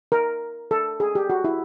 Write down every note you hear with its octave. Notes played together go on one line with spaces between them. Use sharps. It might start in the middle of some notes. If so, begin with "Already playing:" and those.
A#4
A4
G#4
G4
F#4
E4